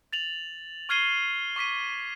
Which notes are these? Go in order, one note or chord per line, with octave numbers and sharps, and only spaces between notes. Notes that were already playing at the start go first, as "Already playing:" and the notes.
A6 F7 F#7
C#6 F6 G#6 C7 D#7 G7
C#6 D6 B6 D#7